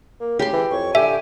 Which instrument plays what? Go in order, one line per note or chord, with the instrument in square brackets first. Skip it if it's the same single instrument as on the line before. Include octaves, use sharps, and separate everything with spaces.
[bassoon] A#3
[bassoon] C#3 [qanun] G4 C6
[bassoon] E3
[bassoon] F2 [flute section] C#5 C#6
[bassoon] D3 [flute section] G4 G5 G#5 [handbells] E5